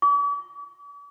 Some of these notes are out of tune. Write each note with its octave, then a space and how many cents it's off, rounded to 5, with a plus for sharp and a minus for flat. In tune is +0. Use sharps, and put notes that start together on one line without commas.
D6 -45